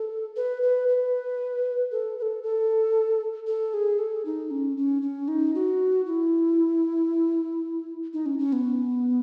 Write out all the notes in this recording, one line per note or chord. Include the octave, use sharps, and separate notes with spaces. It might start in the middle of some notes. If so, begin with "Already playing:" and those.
Already playing: A4
B4
B4
B4
A4
B4
A4
A4
A4
G#4
A4
D#4
C#4
C#4
C#4
D#4
F#4
E4
D#4
C#4
C#4
B3